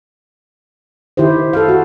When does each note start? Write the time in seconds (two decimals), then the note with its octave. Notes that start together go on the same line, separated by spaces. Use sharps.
1.17 D#3 E4 G4 C5
1.53 A4 F5
1.69 F#4